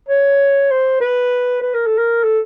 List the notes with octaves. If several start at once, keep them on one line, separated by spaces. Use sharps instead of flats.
C#5
C5
B4
B4
A#4
A4
A#4
A4